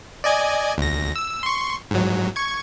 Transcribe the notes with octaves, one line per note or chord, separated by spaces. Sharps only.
D5 D#5 G#5
D2 A#6
E6
C6 C#6
G#2 F#3
C#6 G#6